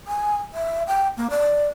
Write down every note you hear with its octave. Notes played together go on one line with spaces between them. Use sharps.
G#5
E5
G5
A#3
D5